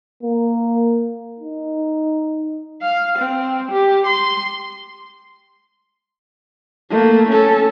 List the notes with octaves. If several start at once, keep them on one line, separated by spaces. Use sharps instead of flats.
A#3
D#4
F5
C4
G4
C6
A3 A#3
C#4 A4